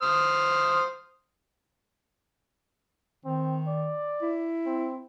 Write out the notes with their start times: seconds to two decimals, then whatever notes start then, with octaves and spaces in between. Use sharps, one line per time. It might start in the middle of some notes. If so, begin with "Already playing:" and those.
0.02 C5 D#6 F6
3.25 D#3 C4
3.68 D5
4.22 E4
4.66 C4